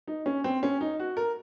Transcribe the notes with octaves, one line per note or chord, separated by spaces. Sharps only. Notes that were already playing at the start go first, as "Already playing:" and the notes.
D#4
C#4
C4
C#4
D#4
F#4
A#4